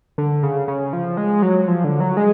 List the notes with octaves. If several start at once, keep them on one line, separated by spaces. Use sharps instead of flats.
D3
C#3
C#3
F3
G#3
F#3
F3
D3
F#3
G#3